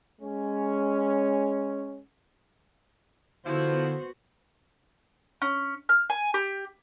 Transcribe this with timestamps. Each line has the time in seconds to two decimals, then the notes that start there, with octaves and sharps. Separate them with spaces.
0.21 G#3 C#4
3.46 D3 F3 B3 E4 F#4 C5
5.42 C#4
5.89 F6
6.10 G#5
6.34 G4